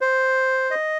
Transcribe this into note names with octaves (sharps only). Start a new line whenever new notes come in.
C5
D#5